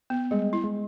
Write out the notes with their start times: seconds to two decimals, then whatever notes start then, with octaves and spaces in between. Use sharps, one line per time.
0.10 B3
0.31 G3 G#3
0.53 E4
0.64 G#3